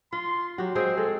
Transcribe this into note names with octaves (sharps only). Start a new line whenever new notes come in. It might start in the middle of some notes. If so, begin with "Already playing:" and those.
F4 C6
F#3 F#4 G4
G#3 C4 G#4 C5
G#3 A4